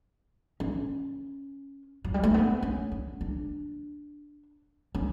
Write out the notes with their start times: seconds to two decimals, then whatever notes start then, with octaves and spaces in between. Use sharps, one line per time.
0.60 C#4
2.04 F#3
2.14 G3
2.24 A3
2.34 B3
2.63 C#4
2.92 D4
3.21 D4
4.95 C#4